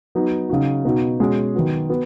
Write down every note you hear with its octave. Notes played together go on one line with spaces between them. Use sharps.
F#3 B3 D#4 F#4
C#3 F#3 D#4 F#4
B2 B3 D#4 F#4
B2 G#3 C#4 F#4
D#3 F#3 B3 F#4
B3 F#4